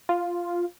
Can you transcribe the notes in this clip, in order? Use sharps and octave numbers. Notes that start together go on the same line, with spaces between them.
F4